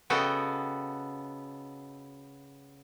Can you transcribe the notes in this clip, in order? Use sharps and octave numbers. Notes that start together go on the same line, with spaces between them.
C#3 B3 F#4 A4 D#5 G5